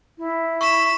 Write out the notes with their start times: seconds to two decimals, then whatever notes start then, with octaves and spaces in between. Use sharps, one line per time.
0.18 E4
0.61 B5 C#6 E7